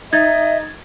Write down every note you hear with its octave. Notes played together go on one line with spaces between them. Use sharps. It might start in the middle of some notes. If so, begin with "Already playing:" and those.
D#4 D#5 E5 G#6 A6